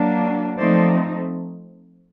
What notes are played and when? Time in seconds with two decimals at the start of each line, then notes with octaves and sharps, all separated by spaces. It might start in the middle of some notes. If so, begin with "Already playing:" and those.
Already playing: F#3 A#3 D4
0.57 F3 A3 C4 D#4 C5 D5